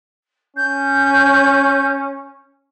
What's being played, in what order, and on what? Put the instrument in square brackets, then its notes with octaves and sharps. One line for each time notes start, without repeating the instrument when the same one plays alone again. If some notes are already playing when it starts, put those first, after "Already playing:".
[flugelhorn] C#4 [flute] G6